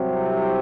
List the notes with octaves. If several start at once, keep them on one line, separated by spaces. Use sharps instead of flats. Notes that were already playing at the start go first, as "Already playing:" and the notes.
Already playing: C2 C3 F#3